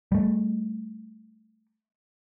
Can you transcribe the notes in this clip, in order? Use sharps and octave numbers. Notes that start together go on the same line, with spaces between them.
G3 A3